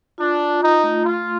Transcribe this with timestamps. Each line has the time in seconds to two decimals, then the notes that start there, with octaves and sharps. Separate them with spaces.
0.18 D4 F4
0.40 F4
0.62 D#4 F4
0.83 A3
1.05 A3 F4